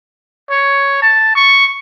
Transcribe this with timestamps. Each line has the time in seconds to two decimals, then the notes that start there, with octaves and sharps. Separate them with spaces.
0.50 C#5
1.02 A5
1.35 C#6